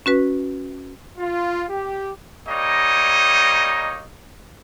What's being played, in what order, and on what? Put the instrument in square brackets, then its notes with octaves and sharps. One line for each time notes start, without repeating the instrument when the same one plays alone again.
[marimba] C#4 F#4 B4
[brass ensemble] F4
G4
[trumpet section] G3 A#3 D#4 C#5 D#5